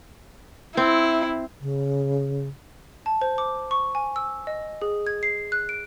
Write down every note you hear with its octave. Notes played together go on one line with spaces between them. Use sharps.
C4 E4
C#3
A5
C5
D6
C#6
G#5
E6
D#5
G#4
G#6
C7
F#6
D7